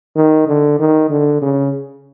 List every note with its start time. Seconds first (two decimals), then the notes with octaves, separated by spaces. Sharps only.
0.16 D#3
0.48 D3
0.79 D#3
1.10 D3
1.42 C#3